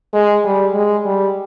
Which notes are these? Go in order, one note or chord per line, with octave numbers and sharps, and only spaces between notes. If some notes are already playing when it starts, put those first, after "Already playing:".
G#3
G3
G#3
G3